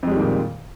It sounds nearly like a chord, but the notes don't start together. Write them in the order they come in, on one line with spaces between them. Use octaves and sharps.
F2 G#3 G3 D#3 A#2